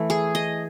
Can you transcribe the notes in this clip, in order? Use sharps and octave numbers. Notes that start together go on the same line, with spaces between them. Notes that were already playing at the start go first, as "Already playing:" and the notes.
Already playing: E3 A3 E4
G#4
D#5